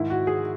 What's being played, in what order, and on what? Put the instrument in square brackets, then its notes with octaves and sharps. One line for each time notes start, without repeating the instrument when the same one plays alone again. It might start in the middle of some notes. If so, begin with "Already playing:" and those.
Already playing: [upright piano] G#2 D#3 E4
F#4
G#4